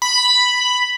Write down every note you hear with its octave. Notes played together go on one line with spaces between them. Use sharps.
B5